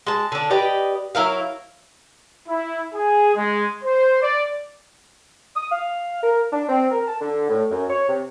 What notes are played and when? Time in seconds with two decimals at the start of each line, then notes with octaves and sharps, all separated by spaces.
0.07 G#3 A5
0.32 D3 D4
0.50 G4 B4 D5 D#5
1.15 F#3 E4 A#4 F5
2.48 E4
2.94 G#4
3.36 G#3
3.84 C5
4.22 D5
5.56 D#6
5.71 F5
6.23 A#4
6.51 D4
6.69 C4
6.91 A#4
7.08 A5
7.21 D3
7.49 A2
7.70 F#2
7.88 C#5
8.09 C3